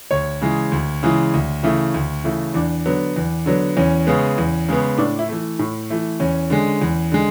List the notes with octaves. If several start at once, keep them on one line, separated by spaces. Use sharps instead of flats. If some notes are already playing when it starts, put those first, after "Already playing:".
D2 C#5
C#3 E3 G#3
D2
C#3 E3 G#3
D2
C#3 E3 A3
D2
C#3 E3 A3
E2 D4
D3 F#3 B3
E2
D3 F#3 B3
E2 C#4
C#3 G#3 B3
E2
C#3 G#3 B3
A2 D4
E4
E3 A3
A2
E3 A3
E2 C#4
D3 G#3
E2
D3 G#3